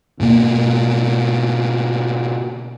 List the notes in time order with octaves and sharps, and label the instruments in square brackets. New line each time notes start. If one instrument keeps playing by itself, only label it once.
[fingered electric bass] G#2 B2 A#3